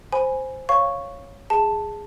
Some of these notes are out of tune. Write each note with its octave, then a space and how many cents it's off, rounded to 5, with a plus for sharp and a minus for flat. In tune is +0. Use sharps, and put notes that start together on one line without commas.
C5 +0 G#5 +0 B5 +0
C#5 +0 F5 +0 C#6 +0
G#4 +0 A5 +0